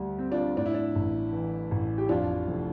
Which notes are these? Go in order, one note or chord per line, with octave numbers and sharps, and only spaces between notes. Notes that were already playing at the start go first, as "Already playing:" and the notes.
Already playing: D2 G3
C4
D4 F4
A2 D4
E4
D4
A1
E3
A1
G4
F2 D4 F4
F1